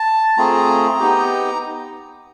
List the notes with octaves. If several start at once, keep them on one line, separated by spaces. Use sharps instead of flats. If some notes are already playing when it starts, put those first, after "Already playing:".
Already playing: A5
A3 C4 F4 G#4 A#5
B3 D#4 G4